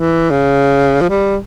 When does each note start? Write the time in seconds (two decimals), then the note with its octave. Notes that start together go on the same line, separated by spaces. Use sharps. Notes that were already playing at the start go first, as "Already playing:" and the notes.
Already playing: E3
0.31 C#3
1.01 F3
1.09 G3